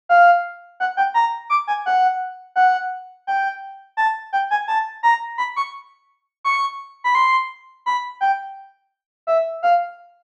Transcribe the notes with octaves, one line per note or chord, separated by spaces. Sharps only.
F5
F#5
G5
A#5
D6
G#5
F#5
F#5
G5
A5
G5
G#5
A5
A#5
B5
C#6
C#6
B5
C6
B5
G5
E5
F5